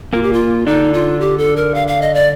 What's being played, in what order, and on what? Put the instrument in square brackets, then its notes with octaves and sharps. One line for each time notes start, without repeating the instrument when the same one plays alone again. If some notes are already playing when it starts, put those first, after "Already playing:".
[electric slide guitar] A#2 A#3 [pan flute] F4
[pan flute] G4
F4
[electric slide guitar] D3 D4 [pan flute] D#4
[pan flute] F4
G4
A4
A#4
F5
F5
D#5
D5